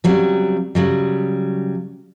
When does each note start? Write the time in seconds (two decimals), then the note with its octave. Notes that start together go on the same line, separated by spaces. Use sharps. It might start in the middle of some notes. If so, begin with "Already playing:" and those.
0.04 C#3 F#3 G3 C4
0.75 C#3 F#3 G3